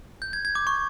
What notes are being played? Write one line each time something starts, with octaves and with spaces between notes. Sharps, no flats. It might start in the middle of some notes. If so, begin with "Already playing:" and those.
G6
G#6
G#6
D6
C#6